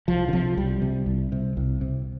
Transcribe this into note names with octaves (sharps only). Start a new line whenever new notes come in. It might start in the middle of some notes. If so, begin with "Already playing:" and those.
C2 F3
D3
C3 F3
C2 G3
C3
C2
C3
C2
C3